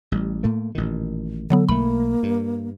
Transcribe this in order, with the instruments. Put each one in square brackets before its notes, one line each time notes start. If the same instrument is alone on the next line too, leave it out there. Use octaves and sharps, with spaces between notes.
[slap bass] A1 G3
A2 A3 A#3
A1 A#2 D#3
[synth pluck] D3 F#3 B3 [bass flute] A4
[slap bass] B1 A3 [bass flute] A#3 [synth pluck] B5
[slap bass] G2